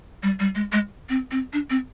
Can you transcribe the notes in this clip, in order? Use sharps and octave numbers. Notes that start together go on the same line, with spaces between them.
G3
G3
G#3
G#3
C4
C4
D4
C4